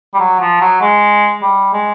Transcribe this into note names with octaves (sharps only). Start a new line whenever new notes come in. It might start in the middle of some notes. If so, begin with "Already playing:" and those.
G3
F#3
F3
F#3
G#3
G3
G#3